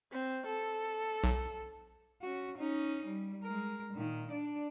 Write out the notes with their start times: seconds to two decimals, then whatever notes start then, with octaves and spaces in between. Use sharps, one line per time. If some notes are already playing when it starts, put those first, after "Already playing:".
0.12 C4
0.46 A4
1.24 B1
2.22 C#4 F#4
2.57 C#4 D#4
3.06 G3
3.44 G#3 A#4
3.94 A#2 D#3
4.31 D4 D5